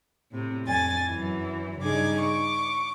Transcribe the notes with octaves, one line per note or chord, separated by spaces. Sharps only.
A2 C3
F2 G#5 A6
F#2 E3
G2 C#3 D#4 G#4 D6 G#6
C#6 D6